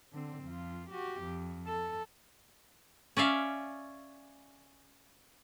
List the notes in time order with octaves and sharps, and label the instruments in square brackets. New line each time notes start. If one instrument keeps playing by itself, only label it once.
[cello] D3 C4
F2 F4
F#4 G4
F2
A4
[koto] C#4 D5 E5 F5